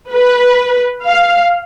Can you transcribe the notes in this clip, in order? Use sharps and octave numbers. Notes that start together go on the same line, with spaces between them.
B4
F5